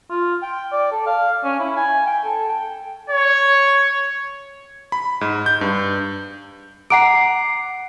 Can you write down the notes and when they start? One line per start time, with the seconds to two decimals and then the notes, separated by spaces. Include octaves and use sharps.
0.10 F4
0.42 G5
0.72 D5
0.92 A4
1.06 F5
1.44 C#4
1.59 E4
1.76 G#5
2.06 G5
2.25 A4
2.49 G5
3.09 C#5
4.92 B5
5.21 G#2
5.46 G6
5.61 G2
6.90 F#5 A#5 D6 C7 D7